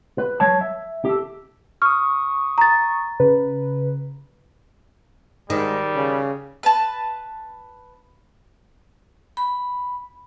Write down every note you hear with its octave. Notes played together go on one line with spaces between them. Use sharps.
B4
F#3 C#5 A5
E5
G4 A4
C#6 D#6 F6
A#5 A6
C#3 B4
G#2 D#3 G3
C#3
B4 A5
B5